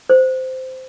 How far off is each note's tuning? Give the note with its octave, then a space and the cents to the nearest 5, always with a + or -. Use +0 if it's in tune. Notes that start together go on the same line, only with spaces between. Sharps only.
C5 -10